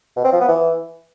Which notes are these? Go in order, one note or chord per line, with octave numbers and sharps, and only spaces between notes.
B2
C4
F3
B3
E3